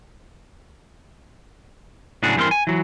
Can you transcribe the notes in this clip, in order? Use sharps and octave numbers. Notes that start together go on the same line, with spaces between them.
A2 C#3 F#3 D4 F#4 G#4
G2 E3 C4 A#4 C6
G#5
E3 F#3